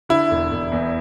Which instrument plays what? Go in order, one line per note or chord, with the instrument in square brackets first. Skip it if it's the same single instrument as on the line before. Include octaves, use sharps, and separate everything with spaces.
[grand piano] D3 [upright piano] E4
[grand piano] E1
E1
E2